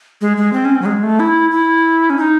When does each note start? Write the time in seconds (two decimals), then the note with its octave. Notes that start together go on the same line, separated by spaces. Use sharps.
0.21 G#3
0.37 G#3
0.53 C4
0.65 C#4
0.75 C4
0.82 F#3
0.86 G#3
1.03 A3
1.20 E4
1.51 E4
2.10 C#4
2.18 D#4